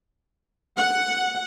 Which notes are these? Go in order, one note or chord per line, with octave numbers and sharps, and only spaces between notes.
F#5